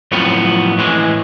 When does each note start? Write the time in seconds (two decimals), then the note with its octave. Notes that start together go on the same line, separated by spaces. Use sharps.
0.12 F2 A2 F#3 B3 F4
0.78 A2 E3 G#3